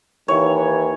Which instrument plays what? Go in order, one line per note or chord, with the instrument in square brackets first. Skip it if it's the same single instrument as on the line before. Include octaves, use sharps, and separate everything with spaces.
[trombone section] D#2 E3 [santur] C#5